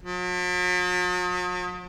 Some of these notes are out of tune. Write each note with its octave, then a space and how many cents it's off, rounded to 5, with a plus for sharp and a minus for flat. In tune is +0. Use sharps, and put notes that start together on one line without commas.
F#3 -45